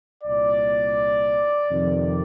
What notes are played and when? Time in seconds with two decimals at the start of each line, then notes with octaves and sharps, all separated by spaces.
0.24 C2 A#2 D5
1.69 F2 C3 D#3